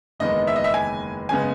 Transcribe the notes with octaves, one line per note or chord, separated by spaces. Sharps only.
F#1 E2 D#3 G#3 B3 D#5
E5
D#5
E5
G#5
F#1 C#3 G#3 B3 G#5